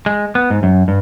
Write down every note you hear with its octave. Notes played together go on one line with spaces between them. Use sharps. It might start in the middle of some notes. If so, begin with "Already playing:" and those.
G#3
B3
G#2
F#2
G2